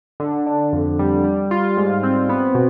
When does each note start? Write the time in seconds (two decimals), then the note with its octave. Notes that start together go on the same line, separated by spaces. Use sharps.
0.20 D3
0.46 D4
0.73 F2
0.99 G3
1.24 G3
1.51 F4
1.77 G#2
2.03 C4
2.29 B3
2.55 B2